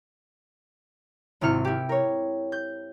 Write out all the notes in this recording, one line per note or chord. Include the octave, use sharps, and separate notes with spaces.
G#1 C3 E4 F6 C#7
E4 G4
A#4 C#5
G6